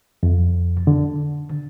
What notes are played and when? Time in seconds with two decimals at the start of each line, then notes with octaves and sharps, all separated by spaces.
0.23 F2
0.87 D3